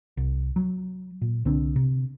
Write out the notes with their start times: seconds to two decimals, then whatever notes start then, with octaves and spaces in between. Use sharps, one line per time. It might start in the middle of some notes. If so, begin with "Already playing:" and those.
0.17 C2
0.56 F#3
1.22 A#2
1.45 C2 D3 C4 D4
1.76 C3